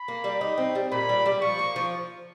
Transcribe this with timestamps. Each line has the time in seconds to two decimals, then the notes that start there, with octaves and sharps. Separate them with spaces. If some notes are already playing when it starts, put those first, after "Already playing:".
Already playing: B5
0.08 A#3
0.24 G3
0.41 D#4
0.58 C4
0.75 G3
0.92 A#2 B5
1.09 G3
1.26 G3
1.42 F3 C#6
1.59 A#3
1.76 F3